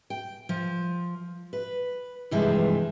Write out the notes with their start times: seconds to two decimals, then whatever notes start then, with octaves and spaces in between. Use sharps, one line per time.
0.10 G5
0.49 F3
1.53 B4
2.31 G2 C3 E3 F3 G#3